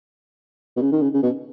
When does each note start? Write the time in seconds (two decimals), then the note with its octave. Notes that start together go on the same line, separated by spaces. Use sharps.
0.77 B2
0.81 C#3
0.92 D#3
1.02 C#3
1.14 C#3
1.23 B2